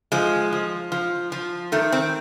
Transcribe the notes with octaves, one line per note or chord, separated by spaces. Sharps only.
F3 G#3
F3
F3
F3
D#3 A3
C4